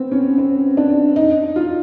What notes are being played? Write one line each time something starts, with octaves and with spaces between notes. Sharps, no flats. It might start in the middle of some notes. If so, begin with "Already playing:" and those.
Already playing: B3 C4
C#4
C4
D4
D#4
F4